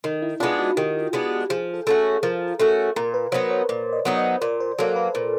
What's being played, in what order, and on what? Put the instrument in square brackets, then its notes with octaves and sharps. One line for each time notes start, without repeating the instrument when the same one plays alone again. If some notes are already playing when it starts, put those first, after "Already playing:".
[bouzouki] D#3 [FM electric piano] D#4
[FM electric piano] E4
[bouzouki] G#3 B3 D4 [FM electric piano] F4
[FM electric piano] F#4
[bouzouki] D#3 [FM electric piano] G4
[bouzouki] G#3 B3 D4
[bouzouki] F3 [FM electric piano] G#4
[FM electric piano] A4
[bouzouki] A3 C#4 F#4
[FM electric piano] A4
[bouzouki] F3 [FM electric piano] A#4
[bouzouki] A3 C#4 F#4
[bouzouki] A#2 [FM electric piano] A#4
[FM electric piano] B4
[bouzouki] F#3 B3 D#4 [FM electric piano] C5
[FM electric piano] C#5
[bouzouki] A#2 [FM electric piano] D5
[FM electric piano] D#5
[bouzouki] F#3 B3 D#4
[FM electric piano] D#5
[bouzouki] A#2 [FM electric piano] D5
[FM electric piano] C5
[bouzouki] F#3 A#3 [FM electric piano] A4
[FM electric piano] B4
[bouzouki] A#2